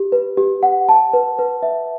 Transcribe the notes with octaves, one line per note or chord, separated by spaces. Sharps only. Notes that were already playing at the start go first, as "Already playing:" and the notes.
Already playing: G4
B4
G4
F#5
A5
B4
B4
E5